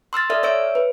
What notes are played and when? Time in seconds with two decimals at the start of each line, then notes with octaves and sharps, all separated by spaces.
0.13 C6 E6 F6 A6
0.30 A4 D5 E5 F6
0.43 C#5 E5 E6 D7
0.75 B4